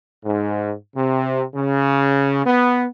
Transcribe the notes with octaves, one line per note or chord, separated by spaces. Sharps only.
G#2
C3
C#3
B3